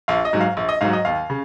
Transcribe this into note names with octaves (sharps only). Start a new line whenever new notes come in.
A#1 F5
D#5
G#2 F#3
F5
A#1
D#5
G#2 F#3 F5
D#5
D#2 F5
C#3